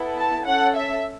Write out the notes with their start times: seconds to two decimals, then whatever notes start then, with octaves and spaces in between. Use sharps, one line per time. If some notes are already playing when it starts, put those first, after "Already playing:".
Already playing: B3 E4 A4
0.17 A5
0.45 C#4 A4 F#5
0.75 E5